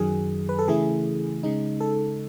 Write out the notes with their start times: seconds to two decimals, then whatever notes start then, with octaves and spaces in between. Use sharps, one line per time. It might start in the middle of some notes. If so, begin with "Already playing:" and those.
Already playing: F#2 D#3 F#3 G#4
0.49 B4
0.59 A4
0.68 C#3 E3 A3 E4 G#4
1.43 C#3 G#3 D#4
1.81 A4